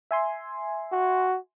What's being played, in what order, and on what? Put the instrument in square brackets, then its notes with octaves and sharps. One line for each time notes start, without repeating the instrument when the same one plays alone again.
[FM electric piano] E5 G#5 C6
[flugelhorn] F#4